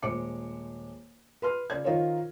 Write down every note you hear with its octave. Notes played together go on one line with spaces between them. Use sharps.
D#1 G#3 C5 D6 C#7
B4 C6 F6
C#3 D5 G#6
D#3 D#4 F4 A#4 C5 C#5